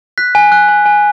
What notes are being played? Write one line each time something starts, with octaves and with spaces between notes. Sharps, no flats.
F#6 B6
G#5
F#6
G#5
G#5